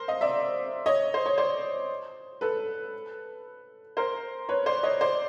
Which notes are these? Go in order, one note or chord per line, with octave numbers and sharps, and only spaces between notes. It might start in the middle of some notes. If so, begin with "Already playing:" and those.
Already playing: A#4 C5
D#5 F5
D5 E5
C#5 D#5
C5
C#5
C5 D5
A4 B4
A#4 C5
B4 C#5
C5 D5
C#5 D#5
C5 D5